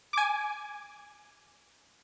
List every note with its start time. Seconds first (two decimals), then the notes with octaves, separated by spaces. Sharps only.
0.13 G#5 D6